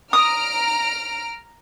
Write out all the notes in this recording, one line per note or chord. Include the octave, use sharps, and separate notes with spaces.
A#5 D#6 F6 D7